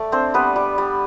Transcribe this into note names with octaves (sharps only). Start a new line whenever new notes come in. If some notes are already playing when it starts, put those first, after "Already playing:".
Already playing: A3 D5
C4 D4 C5
G3 B3 B4
G3
G3